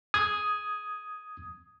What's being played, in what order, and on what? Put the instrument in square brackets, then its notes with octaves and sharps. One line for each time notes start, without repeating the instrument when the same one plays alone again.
[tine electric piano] D#6 G#6